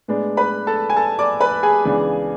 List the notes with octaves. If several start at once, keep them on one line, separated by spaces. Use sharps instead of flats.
A2 G#3 B3 D4
B4 B5
A4 A5
G#5
A4 A5
D5 D6
B4 B5
G#4 G#5
C#2 C#3 E3 B3 D4